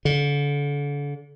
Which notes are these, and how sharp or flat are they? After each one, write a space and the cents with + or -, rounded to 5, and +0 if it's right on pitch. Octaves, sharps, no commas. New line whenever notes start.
D3 -35